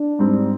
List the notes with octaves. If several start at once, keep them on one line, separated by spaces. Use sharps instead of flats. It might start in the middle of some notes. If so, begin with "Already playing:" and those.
Already playing: D4
G#2 G3 C4